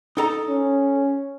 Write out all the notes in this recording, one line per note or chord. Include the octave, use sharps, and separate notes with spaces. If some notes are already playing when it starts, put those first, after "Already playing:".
D#4 A4 A#5
C#4